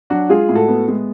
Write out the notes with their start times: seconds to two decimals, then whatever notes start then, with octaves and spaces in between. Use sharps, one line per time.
0.10 F#3 D4 F#4
0.29 G#3 F4 G#4
0.49 A2
0.55 F#4 A4
0.68 B3
0.88 G#3